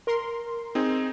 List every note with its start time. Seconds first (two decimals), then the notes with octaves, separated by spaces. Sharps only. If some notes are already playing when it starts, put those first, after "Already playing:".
0.07 A#4 C6
0.75 C4 D#4 G#4